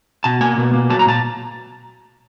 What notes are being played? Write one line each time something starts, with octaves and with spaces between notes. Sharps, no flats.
B2 A5
A#3 G#5
B2
A#3
F#3 A5
A#5
A#2 A5